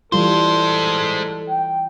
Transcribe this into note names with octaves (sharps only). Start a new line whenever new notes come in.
E3 G3 G#3 F4 A4 C5
G5